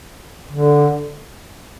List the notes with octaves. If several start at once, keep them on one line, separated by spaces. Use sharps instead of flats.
D3